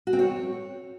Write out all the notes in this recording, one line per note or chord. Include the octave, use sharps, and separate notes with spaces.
F#4
C4
C#5